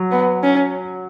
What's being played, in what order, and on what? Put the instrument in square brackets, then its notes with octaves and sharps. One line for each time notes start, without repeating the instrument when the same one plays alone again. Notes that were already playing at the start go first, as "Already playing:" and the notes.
Already playing: [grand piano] F#3
[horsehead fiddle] B3
C#4